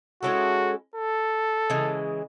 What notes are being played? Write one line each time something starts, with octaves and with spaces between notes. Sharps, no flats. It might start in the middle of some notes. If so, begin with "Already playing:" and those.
G#3 C#4 E4 F#4 A4
A4
C#3 E3 G#3